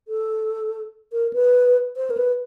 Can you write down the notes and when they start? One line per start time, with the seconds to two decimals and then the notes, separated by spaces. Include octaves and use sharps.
0.08 A4
1.13 A#4
1.33 B4
1.97 C5
2.10 A#4
2.17 B4